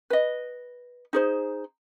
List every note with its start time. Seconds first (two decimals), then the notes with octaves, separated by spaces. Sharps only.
0.10 B4 D#5
1.13 D#4 G#4 C5